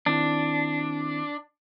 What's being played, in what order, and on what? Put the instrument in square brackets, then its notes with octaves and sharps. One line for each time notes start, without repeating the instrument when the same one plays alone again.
[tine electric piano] D#3 C4 E4 [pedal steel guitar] D4